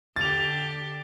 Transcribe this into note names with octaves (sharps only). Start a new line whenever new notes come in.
D3 G4 A6 F7